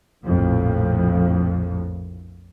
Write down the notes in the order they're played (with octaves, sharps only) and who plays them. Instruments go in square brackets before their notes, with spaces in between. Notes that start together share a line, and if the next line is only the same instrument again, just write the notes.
[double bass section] A#1 F2 A2 F3